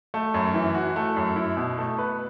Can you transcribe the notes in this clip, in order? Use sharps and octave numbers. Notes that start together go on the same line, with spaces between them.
A3
F#2
E3
F#4
A3
F#2
E4
B2
A3
B4